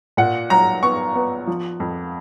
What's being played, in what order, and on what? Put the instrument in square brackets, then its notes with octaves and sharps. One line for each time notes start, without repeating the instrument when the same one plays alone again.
[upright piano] A#2 F#5
F#3 A#5
B3 C#6
B3
F3
F2